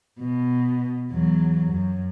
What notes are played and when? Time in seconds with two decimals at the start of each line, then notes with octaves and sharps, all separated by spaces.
0.19 B2
1.11 E2 F#3
1.72 F#2